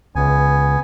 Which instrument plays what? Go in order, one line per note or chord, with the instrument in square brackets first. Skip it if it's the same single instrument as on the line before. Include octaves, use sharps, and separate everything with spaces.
[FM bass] C#2 [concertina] B3 G#5